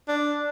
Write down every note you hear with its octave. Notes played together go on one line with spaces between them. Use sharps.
D4